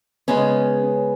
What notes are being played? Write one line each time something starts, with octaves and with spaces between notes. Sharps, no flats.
C#3 G#3 B3 C#4